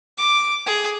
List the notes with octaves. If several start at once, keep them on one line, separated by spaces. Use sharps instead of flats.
D6
G#4